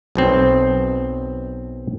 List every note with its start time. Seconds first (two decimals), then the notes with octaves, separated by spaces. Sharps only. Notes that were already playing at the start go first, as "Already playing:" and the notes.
0.15 B1 B2 C4